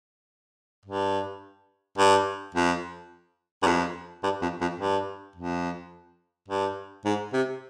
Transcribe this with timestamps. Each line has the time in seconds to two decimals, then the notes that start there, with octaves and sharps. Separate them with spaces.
0.85 G2
1.98 G2
2.55 F2
3.62 G2
3.67 F2
4.23 G2
4.42 F2
4.61 F2
4.80 G2
5.36 F2
6.48 G2
7.05 G#2
7.33 C3